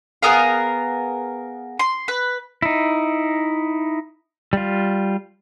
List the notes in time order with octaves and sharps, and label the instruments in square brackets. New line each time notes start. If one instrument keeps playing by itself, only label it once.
[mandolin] B3 G#4 A#4 F5
C6
B4
[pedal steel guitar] D#4 E4
G3 F4